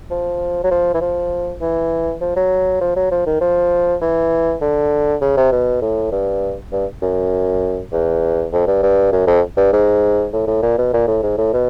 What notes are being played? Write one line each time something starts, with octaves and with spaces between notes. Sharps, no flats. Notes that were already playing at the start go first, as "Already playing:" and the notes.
F3
F#3
F3
E3
F3
E3
F3
F#3
F3
F#3
F3
D#3
F3
E3
D3
C#3
C3
B2
A2
G2
G2
F#2
E2
F2
G2
G2
F#2
F2
G2
G#2
A2
A2
A#2
B2
A#2
A2
G#2
A2
B2